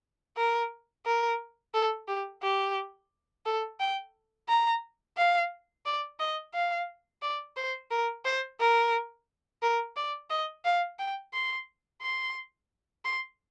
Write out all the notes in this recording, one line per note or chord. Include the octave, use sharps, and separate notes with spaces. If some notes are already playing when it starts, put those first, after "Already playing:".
A#4
A#4
A4
G4
G4
A4
G5
A#5
F5
D5
D#5
F5
D5
C5
A#4
C5
A#4
A#4
D5
D#5
F5
G5
C6
C6
C6